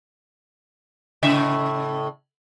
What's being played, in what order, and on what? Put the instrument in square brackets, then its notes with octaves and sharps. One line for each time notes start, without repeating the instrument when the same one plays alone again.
[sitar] A2 C#3 E5